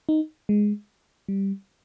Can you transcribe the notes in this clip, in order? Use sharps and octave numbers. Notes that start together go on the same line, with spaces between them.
D#4
G#3
G3